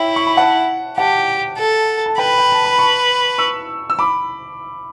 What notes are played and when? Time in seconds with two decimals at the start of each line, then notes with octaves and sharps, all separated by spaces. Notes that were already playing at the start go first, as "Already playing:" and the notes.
Already playing: E4 C#5 E5 G5
0.16 C#6
0.27 B5
0.37 F#5 A5
0.97 G4 F#5 A5
1.58 A4
2.06 A5
2.18 B4 G5 B5
2.39 G5
2.52 A5
2.65 B5
2.78 A5 C#6
3.38 C#6 E6
3.90 E6
3.99 B5 D6